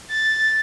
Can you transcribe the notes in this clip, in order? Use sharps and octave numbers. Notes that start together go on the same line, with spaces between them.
A6